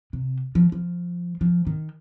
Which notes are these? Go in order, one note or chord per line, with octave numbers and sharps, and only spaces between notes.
C3
F3
F3
F3
D#3